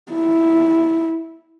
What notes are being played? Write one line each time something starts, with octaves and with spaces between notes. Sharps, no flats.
E4